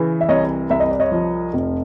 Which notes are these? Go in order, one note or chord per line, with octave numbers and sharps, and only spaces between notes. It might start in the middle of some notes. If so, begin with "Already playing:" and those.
Already playing: C#3 E3
E5
C2 C#5 D#5
C2 E5
D#5
D5
C#5 D#5
F3
F1